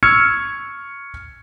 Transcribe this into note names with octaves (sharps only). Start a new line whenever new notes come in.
C#6 E6 F6 G#6 C#7